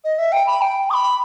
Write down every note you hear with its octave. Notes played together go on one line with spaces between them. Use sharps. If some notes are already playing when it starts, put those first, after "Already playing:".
D#5
E5
G5
B5
G5
D#6
B5